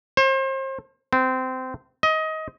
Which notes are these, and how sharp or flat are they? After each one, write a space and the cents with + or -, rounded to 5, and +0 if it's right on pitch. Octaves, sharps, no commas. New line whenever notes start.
C5 +35
C4 -20
D#5 +20